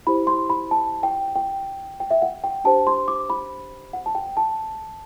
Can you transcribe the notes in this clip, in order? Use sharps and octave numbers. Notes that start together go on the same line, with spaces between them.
E4 G4 C5 B5
C6
B5
A5
G5
G5
G5
E5
F#5
G5
D4 G4 C5 A5
C6
D6
B5
F#5
A5
G5
A5